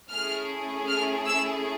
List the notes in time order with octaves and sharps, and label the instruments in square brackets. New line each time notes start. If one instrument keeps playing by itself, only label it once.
[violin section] A3 C#4 E4 G#4 F6
F6
E6